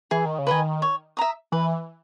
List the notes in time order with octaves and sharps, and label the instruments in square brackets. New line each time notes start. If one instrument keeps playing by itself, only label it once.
[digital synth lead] E3 [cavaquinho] G#4
[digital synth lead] D#3
C#3
[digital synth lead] D#3 [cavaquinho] B4 D#5 G#5
[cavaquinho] C#5
E5 A#5 D#6
[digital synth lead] E3 [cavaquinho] B4